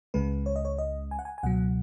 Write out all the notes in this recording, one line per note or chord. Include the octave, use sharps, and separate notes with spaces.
C#2 C#3 G#3 B4
C#5
D#5
C#5
D#5
G#5
F#5
G#5
G#5
C#2 B2 F#3 F#5